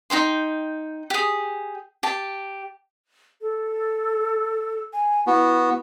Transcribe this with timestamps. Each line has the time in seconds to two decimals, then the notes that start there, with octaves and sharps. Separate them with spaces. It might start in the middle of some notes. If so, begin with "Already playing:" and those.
0.10 D#4 E4 G5 C6
1.10 G4 G#4
2.03 G4 A5
3.41 A4
4.93 G#5
5.27 B3 E4 F#4